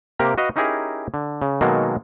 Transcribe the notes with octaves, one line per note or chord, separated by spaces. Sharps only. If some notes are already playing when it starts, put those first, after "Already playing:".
C3 A#3 G4 A#4
F#4 B4 D#5 F5
C#4 D#4 E4 G4 G#4 A#4
D3
C#3
B2 D#3 F#3 G#3 A#3 A4